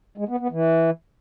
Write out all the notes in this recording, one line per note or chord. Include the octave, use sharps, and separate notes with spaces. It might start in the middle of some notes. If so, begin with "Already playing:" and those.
G#3
B3
B3
E3